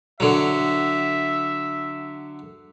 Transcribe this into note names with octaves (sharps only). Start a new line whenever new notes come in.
D3 F#3 E5